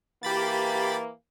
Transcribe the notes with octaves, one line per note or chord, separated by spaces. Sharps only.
E3 A#3 G4 B5 A6